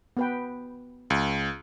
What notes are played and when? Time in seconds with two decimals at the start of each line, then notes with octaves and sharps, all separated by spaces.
0.17 B3 B4 G5
1.10 C#2